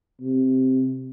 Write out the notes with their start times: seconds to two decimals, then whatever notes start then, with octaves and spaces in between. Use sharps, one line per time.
0.21 C3